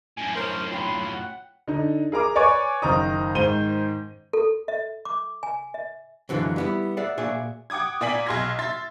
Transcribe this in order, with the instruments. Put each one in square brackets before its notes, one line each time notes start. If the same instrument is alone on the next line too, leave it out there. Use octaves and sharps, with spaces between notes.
[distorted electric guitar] F#2 A2 [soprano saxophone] G#5
[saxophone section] C4 C#4 A#4 [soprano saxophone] C5
[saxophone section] A#2 F#3 F4 [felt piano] G5 B5 [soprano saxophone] C6
[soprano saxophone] F#5
[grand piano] D3 D#4
G#4 A#4 A#5 D6
B4 C#5 D5 G#5 C#6
F#1 D#3 C5 A#5 D#6
G#2 D#3 C5 D#7 G7
[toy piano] A4
E5
D6
G#5
E5
[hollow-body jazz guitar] F#2 D3 E3 F3 G#3
G3 B3 E4
G#4 D5 E5 F#5
A#2 F#4 G#4 D5 E5
[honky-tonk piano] F#5 G5 D6 D#6 G#6
A#2 A#3 D5 G#5 B6 F#7
B1 G#4 C6 F6 G#6 A#6
E5 C6 A6